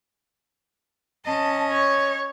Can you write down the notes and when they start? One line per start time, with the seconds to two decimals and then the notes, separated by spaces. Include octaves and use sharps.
1.26 C#4 D#5 A5
1.71 C#5